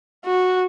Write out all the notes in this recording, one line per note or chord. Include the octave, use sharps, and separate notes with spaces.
F#4